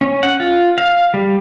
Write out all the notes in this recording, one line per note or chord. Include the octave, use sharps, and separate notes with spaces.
C#4
F#5
F4
F5
G3